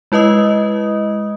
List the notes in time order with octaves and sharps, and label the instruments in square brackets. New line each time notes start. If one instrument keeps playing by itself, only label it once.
[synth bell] G#3 E4 B4 D#5 D#6